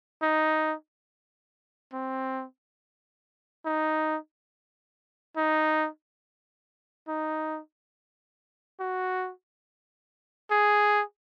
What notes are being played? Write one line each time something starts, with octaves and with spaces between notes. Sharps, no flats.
D#4
C4
D#4
D#4
D#4
F#4
G#4